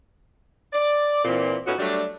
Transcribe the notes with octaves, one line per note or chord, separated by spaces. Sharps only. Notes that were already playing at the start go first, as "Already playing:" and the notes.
D5
A#2 E3 C4
A2 B3 C#4 D#4 F4 F#4
F#3 G3 A3 D4